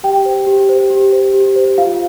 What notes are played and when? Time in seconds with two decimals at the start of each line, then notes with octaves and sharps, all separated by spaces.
0.04 G4 G5
0.26 C5
0.47 G4
0.69 C5
0.90 G4
1.12 C5
1.34 G4
1.56 C5
1.78 F4 F5